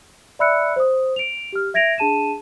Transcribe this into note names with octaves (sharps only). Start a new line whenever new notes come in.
D5 E5 B5 E6 F#6 C#7
C5 D#6
D7 F7
G4 F6
E5 G#6 A#6 D7 F7
D4 G#4 A5 D#7 E7